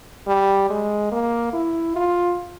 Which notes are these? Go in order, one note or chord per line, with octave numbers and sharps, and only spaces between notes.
G3
G#3
A#3
E4
F4